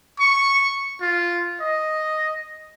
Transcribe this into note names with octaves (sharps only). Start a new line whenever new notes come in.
C#6
F4
D#5